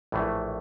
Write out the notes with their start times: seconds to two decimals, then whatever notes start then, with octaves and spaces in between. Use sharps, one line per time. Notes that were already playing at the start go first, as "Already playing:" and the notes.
0.12 A#1 A2 E3 A3